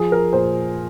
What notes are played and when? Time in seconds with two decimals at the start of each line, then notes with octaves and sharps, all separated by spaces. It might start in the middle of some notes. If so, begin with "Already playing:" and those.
Already playing: F3 G#4
0.12 A#4
0.33 A#2 C5